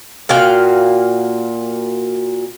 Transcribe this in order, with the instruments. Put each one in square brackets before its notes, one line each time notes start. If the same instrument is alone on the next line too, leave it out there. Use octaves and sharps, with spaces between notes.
[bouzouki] A#2 F#4 F5 G5